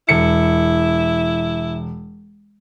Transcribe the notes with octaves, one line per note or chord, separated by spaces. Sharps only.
E1 E4 C#7